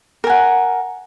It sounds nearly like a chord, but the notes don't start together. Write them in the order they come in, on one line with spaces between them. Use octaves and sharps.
A#4 G#5 F#5